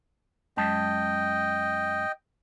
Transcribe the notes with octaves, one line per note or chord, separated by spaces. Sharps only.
F#2 G#3 D#5 G5 A5